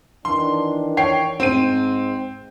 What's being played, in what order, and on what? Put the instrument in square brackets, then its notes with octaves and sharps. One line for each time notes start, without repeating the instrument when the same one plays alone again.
[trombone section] D#3 E3 D4 [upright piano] C6
[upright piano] C#5 G5 C7
[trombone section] G#2 [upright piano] C4 D#7